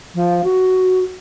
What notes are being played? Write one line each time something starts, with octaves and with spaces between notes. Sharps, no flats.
F3
F#4